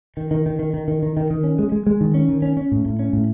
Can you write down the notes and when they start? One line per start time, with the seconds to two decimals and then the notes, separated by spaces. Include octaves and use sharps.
0.17 D#3
0.31 D#3
0.46 D#3
0.59 D#3
0.74 D#3
0.88 D#3
1.03 D#3
1.17 D#3
1.30 D#3
1.44 C#4
1.59 G#3
1.72 G#3
1.86 G#3
2.01 D#3
2.14 C#4
2.29 D#3
2.42 C#4
2.57 C#4
2.72 A2
2.86 A2
2.99 C#4
3.13 A2